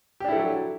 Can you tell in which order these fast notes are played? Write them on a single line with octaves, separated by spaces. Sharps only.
G4 D4 E4 A4 F#3